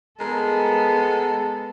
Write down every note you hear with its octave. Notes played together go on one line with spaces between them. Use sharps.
G#3 B3 A4 A#4